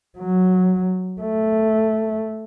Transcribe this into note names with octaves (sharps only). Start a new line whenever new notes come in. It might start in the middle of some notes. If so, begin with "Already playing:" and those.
F#3
A3